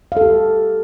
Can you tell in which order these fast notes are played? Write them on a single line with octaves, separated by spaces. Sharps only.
F5 A4 G4